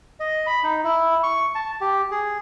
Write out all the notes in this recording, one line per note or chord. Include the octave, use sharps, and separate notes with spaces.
D#5
B5
D#4
E4
C#6
A5
G4
G#4